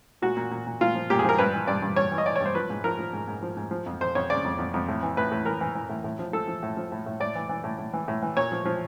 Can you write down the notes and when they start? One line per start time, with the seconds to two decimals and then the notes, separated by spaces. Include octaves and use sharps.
0.22 A#2 F#4
0.37 A#2
0.51 A#2
0.67 A#2
0.81 A#2 F4
0.95 F3
1.10 A#2 G4
1.19 G#4
1.24 F3 A#4
1.38 G2 B4
1.53 E3
1.67 G2 D5
1.82 G2
1.96 G2 C#5
2.12 E3
2.18 D#5
2.26 E3 D5
2.36 C#5
2.40 G2
2.46 C5
2.55 F3 B4
2.70 G#2
2.84 F3 A#4
2.99 F3
3.13 G#2
3.28 G#2
3.42 F3
3.57 G#2
3.71 F3
3.86 F2
4.01 F2 C5
4.15 F2 C#5
4.30 C#3 D5
4.44 F2
4.58 F2
4.74 F2
4.88 A2
5.03 E3
5.17 A2 B4
5.31 A2
5.46 E3 A#4
5.61 E3
5.75 E3
5.89 A2
6.04 A2
6.19 F3
6.33 F3 A4
6.48 F3
6.63 A2
6.77 F3
6.92 A2
7.06 A2
7.20 A2 D5
7.35 E3
7.49 E3
7.64 A2
7.78 A2
7.94 E3
8.08 A2
8.22 E3
8.37 A#2 C#5
8.52 F3
8.65 F3